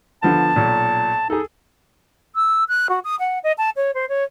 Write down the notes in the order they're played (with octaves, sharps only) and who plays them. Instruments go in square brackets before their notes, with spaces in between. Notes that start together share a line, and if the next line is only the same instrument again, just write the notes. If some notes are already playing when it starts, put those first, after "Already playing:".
[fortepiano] D3 F3 B3 [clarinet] A5
[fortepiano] B1 A#2
[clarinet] D#4 [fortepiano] G#4 A4
[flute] E6
F#6
F#4
D#6
F#5
D#5
A5
C#5
C5
C#5